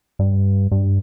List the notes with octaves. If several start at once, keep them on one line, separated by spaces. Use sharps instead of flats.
G2
G2